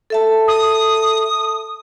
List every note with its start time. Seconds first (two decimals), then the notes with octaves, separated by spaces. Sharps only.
0.10 A4 E5 A5
0.47 D#6